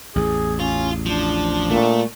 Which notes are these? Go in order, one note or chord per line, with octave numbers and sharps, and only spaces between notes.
A1 E2 G#4
C#4 F4
F3 D4
A#2 A3